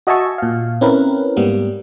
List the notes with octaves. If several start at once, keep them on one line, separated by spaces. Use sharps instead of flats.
F#4 D#5 E5 G#5 A5 C#6
A#2 F5
C4 C#4 E4 A#4 B4
G#2 G3 A#3 B3